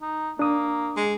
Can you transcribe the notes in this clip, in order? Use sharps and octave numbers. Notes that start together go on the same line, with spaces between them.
D#4
A#3 D4 D#6
G#3